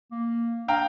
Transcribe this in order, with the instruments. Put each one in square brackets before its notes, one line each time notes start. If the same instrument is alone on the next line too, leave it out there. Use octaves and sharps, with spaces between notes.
[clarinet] A#3
[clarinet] D4 [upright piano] F5 G5 A#5